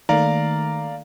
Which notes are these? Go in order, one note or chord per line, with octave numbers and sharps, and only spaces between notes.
D#3 A3 A#3 D5 F5 A#5